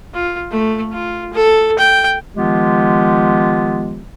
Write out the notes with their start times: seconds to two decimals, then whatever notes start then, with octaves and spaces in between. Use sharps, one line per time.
0.14 F4
0.51 A3
0.92 F4
1.33 A4
1.79 G5
2.36 D#3 F3 G#3 B3 F4 G4